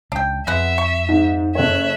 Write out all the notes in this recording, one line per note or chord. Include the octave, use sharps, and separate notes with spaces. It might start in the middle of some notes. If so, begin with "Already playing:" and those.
C#2 D4 G5
F2 G#3 B3 E5 F#5
C#6
G#2
F#1 A4 C#5 E5 F#6